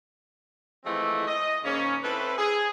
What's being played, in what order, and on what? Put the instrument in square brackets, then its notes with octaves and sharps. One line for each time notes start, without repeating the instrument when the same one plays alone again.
[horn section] E3 F3 G#3 A3 C4 E4
D#5
G#2 C#3 A#3 C#4
C4 E4 A4 B4
G#4